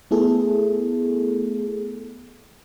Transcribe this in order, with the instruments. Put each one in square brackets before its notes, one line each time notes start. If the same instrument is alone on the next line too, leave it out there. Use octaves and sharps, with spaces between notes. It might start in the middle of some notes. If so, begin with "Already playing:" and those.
[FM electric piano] A3 B3 E4 G#4 A4